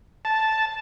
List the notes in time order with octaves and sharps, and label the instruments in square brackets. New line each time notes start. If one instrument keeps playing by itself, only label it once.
[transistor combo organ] A5